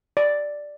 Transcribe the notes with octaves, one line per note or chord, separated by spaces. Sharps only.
D5